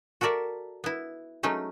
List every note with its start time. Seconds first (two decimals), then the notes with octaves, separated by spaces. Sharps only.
0.21 F#4 A4 A#4 D5 E5
0.84 B3 E4
1.43 F#3 G#3 A3 C#4 D#4